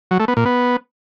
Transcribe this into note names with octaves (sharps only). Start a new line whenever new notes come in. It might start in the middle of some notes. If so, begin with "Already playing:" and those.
F#3
A3
B3
A#2
B3